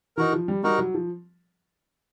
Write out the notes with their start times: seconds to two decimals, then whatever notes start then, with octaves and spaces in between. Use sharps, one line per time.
0.17 E3 D#4 F#4 A#4
0.33 F3
0.48 G3
0.63 G3 D#4 F#4 A#4
0.78 F#3
0.94 F3